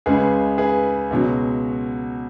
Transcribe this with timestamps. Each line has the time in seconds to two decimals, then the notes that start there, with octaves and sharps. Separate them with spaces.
0.06 C#2 C#3 G#3 G#4 B4
0.58 G#4 B4
1.10 C#2 B2 F#3